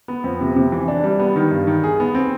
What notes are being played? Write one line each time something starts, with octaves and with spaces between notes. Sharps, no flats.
B3
F2
C3
C3
E3
D4
G3
B3
D#3
G2
D#3
G#4
B3
C4